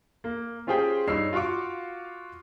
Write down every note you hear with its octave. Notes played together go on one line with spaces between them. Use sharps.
A#3
C#4 F4 G4 G#4 C5 G5
G2 D#4 C#5 E6 C7
F4 F#4 F5 C#6 D6